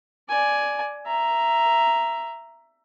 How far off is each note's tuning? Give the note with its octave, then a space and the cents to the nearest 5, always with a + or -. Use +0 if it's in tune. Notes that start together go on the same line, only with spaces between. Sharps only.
D5 +0 G#5 +10
E5 +15 A#5 +0